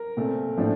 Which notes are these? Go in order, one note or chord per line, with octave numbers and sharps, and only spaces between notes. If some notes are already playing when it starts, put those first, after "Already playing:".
Already playing: A#4
A#2 A3 C4
A2 F3 A3 D4